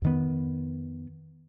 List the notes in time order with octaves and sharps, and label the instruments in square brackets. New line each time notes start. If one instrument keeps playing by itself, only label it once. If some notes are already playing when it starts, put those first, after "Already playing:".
[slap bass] F2 D#3 B3